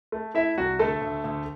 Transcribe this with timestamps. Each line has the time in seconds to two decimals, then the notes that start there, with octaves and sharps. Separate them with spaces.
0.12 A3
0.35 A3 E4 E5
0.57 C2 F#4
0.79 D2 A3 A4
1.02 D2
1.24 D2